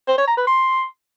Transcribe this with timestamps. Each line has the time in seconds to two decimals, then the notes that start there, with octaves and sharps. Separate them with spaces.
0.08 C5
0.18 C#5
0.28 A#5
0.37 B4
0.47 C6